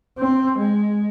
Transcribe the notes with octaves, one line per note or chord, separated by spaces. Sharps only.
C4
G#3